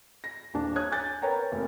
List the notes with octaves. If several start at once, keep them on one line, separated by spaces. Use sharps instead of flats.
A#6
D#1 D4 A5
C#5 D#6 F#6 G#6
G#5 D6 F#6 G6 A6
A#4 B4 C#5 G5 G#5 A#5
F1 A#3